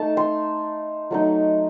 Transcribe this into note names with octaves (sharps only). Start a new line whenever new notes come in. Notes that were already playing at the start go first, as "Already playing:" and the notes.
Already playing: A3 D#4 A5
C6
F#3 A3 D#4